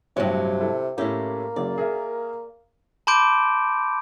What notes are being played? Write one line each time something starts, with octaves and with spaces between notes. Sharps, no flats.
A1 G2 C3 F#3 C#5
E4 A4
A2 A#3 C#4 E4 G4
F#1 C#3 F#3 D5
G#4 A#4 E5
A5 B5 C6 D6 G6 D7